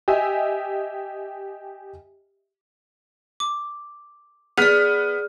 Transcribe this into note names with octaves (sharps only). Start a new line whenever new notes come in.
G4 D#5 E5 G#5
D6
B3 G#4 D5 F6 B6